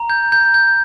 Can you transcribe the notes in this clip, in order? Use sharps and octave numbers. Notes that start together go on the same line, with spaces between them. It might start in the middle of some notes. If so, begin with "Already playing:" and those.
Already playing: A#5
G6
G6
G6